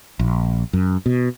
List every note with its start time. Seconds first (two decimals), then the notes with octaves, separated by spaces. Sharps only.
0.19 A#1
0.73 F#2
1.06 B2